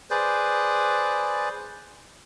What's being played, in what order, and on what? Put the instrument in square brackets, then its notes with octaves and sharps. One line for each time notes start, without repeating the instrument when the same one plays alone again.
[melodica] G#4 B4 C5 D5